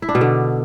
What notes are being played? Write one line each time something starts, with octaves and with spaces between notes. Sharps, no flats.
E4
D4
B2
D3